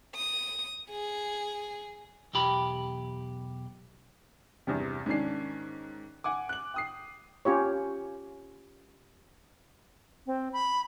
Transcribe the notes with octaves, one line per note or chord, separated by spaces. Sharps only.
D#6
G#4
B1 E2 G4 B5
E2 G2 C3
G#2 D#3 C#4 D4 C7
F#5 G#5 D6
F#6 F#7
G5 D#6 C7
C#4 F4 G4 C#5
C4
B5